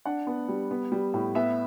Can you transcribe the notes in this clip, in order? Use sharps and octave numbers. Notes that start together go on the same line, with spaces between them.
D4 F#5
B3
G3
B3
G3
A2
B3 E5